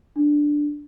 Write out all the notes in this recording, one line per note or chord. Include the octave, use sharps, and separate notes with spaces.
D4